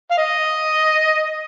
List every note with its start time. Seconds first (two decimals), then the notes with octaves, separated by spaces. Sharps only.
0.11 F5
0.18 D#5